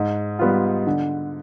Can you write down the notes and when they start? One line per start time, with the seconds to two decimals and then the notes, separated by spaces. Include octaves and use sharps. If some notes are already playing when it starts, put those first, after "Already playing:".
Already playing: G#2
0.39 G3 B3 F4
0.87 D3